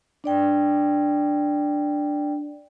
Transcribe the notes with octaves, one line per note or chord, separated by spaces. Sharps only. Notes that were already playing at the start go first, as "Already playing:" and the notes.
D4 D5 G5